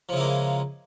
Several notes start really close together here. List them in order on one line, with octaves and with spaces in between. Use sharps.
F3 C#3 E4 A#3 G#3